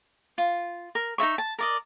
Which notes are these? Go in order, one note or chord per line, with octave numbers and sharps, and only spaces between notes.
F4
A#4
D#4 A#4 E5 C#6
A5
A#4 D5 D#5